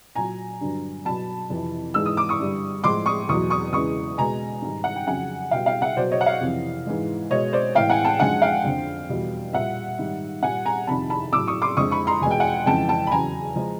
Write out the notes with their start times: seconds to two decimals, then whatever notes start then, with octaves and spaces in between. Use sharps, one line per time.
0.15 A#2 F#3 G#5 A#5
0.61 G2 D3 F#3
1.05 B2 F#3 A5 B5
1.50 F2 C3 E3
1.94 G#2 E3 G#3 E6
2.06 D#6
2.17 D6
2.29 C#6 D#6
2.39 G2 D3 G3
2.84 A2 F3 G#3 C6 D6
3.06 C#6 D#6
3.29 E2 B2 F#3 C#6 D#6
3.50 C#6 D#6
3.73 E2 C#3 E3 G#3 C#6 D#6
4.17 B2 G#3 G#5 A#5
4.62 G#2 D#3 G3
4.84 F#5
4.96 G5
5.07 F2 C#3 F#3 F#5 G#5
5.51 B2 G3 F5 G5
5.66 F5 G5
5.81 E5 F#5
5.96 B2 F#3 C5 D5
6.11 C#5 D#5
6.21 F#5
6.26 D#5 F5
6.41 F2 C3 E3
6.87 G#2 E3 G#3
7.30 B2 G#3 C#5 D#5
7.53 C5 D5
7.75 A2 E3 G#3 F5 G5
7.90 F#5 G#5
8.05 G5 A5
8.20 F#2 D3 F3 G#3 F#5 G#5
8.42 F5 G5
8.64 F2 D3 F3
9.09 E2 B2 G3
9.53 A#2 G3 E5 F#5
9.98 G#2 D#3 G3
10.43 A#2 G3 F#5 G#5
10.65 G#5 A#5
10.87 F2 C3 D#3 A5 B5
11.10 A5 B5
11.32 A2 F#3 D6 E6
11.48 C#6 D#6
11.62 C6 D6
11.77 F2 D3 F3 G#3 C#6 D#6
11.91 B5 C#6
12.07 A#5 C6
12.21 E2 B2 G#3 G#5
12.31 G5
12.40 F#5 G#5
12.66 F2 C#3 E3 G#3 G5 A5
12.89 G5 A5
13.07 B5
13.11 E2 C#3 F#3 G#5 A#5
13.56 F3 G#3